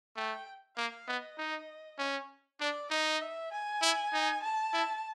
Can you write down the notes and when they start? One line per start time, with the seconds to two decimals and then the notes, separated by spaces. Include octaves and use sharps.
0.16 A3 G5
0.77 A#3 F5
1.08 B3 D#5
1.38 D#4
1.99 C#4
2.60 D4 D5
2.91 D#4 D#5
3.21 E5
3.52 G#5
3.82 E4
4.13 D#4
4.42 A5
4.73 E4